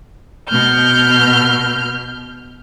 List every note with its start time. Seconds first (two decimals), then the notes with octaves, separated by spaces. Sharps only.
0.49 B2 F6 G6